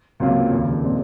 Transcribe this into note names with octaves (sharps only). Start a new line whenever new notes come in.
C#2 C3 F#3 A#3 F4
F1 D#2 C#3
A#2 G#3 C4 D#4